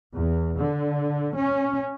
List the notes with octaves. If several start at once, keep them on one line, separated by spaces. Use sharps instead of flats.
E2
D3
C#4